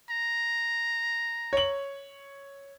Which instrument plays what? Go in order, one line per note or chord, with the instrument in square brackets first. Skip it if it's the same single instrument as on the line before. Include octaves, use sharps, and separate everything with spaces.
[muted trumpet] A#5
[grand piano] C#5 F#7